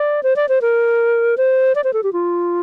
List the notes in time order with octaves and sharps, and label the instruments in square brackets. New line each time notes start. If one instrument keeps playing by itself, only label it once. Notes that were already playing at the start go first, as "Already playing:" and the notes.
Already playing: [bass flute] D5
C5
D5
C5
A#4
C5
D5
C5
A4
G4
F4